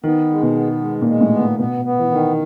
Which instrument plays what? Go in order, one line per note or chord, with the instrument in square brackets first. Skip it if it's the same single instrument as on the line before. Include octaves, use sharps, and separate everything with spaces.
[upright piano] D#3 [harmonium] B3
[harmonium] G#3
[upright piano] B2
[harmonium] B3
G#3
[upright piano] A#2
[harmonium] G#3
[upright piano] A2
[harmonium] B3
[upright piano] A#2
[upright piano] B2 [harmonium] B3
[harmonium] B3
[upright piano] E3
[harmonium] D#3